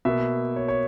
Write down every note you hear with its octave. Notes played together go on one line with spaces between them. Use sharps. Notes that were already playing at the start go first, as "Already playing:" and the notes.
B2 A#3 E5
C#5
C#5